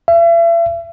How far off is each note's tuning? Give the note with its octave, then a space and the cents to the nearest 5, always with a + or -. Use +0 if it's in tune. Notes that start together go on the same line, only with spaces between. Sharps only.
E5 +40